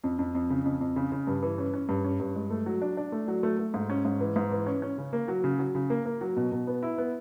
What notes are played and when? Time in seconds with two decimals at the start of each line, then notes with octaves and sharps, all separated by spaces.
0.04 F2
0.19 F2
0.35 F2
0.50 C#3
0.65 F2
0.81 F2
0.96 C#3
1.12 C#3
1.27 G2
1.43 E3
1.58 C#4
1.74 C#4
1.89 G2
2.05 C#4
2.20 G2
2.35 G#3
2.50 A3
2.66 F#3
2.82 D4
2.97 D4
3.12 A3
3.28 F#3
3.43 A3
3.59 A3
3.74 G#2
3.90 C#4
4.05 G#2
4.21 E3
4.36 G#2
4.52 E3
4.66 C#4
4.82 C#4
4.98 C#3
5.13 A#3
5.28 F#3
5.44 C#3
5.59 F#3
5.75 C#3
5.90 A#3
6.05 A#3
6.21 F#3
6.36 B2
6.52 B2
6.67 B3
6.83 E4
6.98 B3